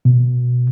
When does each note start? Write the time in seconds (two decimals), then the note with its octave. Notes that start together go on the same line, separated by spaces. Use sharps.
0.05 B2